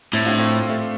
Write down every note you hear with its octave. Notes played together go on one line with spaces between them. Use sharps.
A2 C4 E4
D4 F4
A3 C4
A3